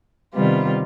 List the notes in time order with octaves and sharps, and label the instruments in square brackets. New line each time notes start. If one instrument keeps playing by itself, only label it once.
[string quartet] C3 D#3 G3 B3 F4